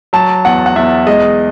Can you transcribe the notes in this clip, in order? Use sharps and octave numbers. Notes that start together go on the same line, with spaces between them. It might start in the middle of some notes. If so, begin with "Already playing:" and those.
F#3 A5
E2 F#5
F#5
E2 E5
G#3 D#5